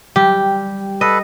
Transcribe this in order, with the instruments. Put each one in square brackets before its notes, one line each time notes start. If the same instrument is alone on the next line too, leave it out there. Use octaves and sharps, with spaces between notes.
[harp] G3 [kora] G4
[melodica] A4 B4 [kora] D#5